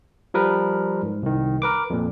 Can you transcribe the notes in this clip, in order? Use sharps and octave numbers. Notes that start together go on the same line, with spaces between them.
F3 G3 A#4 B4
G#2
C2 D#3
A#4 B4 D6
F2 A#2